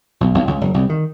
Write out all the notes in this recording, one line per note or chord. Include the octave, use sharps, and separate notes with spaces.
B1
B1
C#2
F#1
C2
D#3